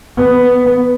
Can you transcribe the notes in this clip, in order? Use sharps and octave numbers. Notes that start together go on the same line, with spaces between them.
B3